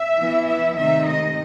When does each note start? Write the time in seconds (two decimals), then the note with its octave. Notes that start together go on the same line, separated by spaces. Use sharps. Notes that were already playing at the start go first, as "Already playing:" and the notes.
Already playing: E5
0.18 E3 B3 E4
0.48 E5
0.77 C3 D#3 A3 C4 D#4 E5
1.08 D#5